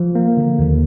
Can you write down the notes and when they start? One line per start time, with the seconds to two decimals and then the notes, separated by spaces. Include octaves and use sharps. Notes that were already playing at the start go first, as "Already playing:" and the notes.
Already playing: F3
0.15 A#3
0.37 D3
0.59 D#2